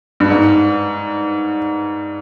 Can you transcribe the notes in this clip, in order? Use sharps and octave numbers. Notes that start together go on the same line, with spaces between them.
G2
G#2